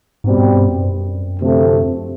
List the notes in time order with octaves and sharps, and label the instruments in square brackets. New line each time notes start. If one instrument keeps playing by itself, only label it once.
[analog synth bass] G#2 [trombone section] B2 G3 C4
[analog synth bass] G#2
G2
F#2
[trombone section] D2 C3 F3 A3 C4